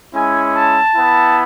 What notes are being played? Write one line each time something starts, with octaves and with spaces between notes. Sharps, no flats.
G#3 C#4 E4 G#5
A5
B3 E4